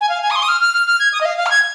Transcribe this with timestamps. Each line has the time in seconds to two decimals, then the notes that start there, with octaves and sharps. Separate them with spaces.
0.01 G#5
0.09 F5
0.22 G#5
0.31 D#6
0.35 C6
0.42 D#6
0.48 F6
0.60 F6
0.74 F6
0.87 F6
1.00 G#6
1.13 D#6
1.21 D#5
1.25 F5
1.38 F5
1.46 F6
1.50 G#6